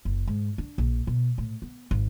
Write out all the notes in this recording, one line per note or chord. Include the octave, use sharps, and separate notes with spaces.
F#1
G#2
D4
A#1
B2
A2
B3
G#1